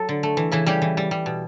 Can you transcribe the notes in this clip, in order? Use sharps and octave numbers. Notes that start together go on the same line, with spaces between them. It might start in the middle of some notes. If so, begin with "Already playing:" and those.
Already playing: F#3 A4
D3
A3
E3
C#3 E3 E4
C#3 G3 G4
E3
G3
G3
B2